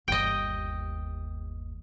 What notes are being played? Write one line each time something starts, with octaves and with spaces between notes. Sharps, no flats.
G1 D#2 D#5 G5